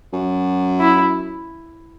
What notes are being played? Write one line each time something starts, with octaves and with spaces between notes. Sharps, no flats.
F#2
E4